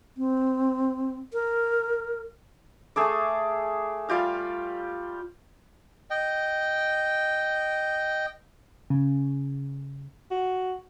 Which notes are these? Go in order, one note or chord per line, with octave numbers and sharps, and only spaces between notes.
C4
A#4
A3 G#4 A4 D6
G3 F4 G4 F5
D#5 G5
C#3
F#4